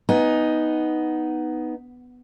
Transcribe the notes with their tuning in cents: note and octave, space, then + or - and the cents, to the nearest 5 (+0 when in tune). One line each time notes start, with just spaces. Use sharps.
B3 +0 D#4 +5 G#5 -15